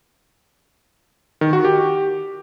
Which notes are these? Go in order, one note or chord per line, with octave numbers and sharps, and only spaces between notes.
D#3
F#4
G4